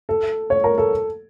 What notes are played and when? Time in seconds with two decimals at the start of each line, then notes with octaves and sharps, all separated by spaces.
0.09 A4
0.50 C#5
0.64 A#4
0.78 A4